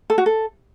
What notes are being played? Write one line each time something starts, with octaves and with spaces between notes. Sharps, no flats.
A4
F#4
A4